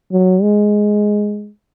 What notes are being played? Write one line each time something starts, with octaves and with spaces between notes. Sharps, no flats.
F#3
G#3